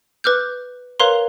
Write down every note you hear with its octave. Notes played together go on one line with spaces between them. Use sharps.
B4 D6 F6 G6
A#4 B4 C#5 F5 A#5 C6